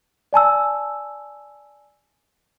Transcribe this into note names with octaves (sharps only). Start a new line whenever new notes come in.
D5 G#5 A5 E6